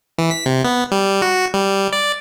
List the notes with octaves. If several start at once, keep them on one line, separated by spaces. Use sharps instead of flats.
E3
B6
C3
B3
G3
F#4
G3
D5